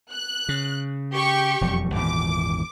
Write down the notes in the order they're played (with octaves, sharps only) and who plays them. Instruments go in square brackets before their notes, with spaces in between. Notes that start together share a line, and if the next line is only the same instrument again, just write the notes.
[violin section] F#6
[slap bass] C#3
[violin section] G4 C#6
[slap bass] E1 F2 F#3
[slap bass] G#1 E2 A#2 [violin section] D6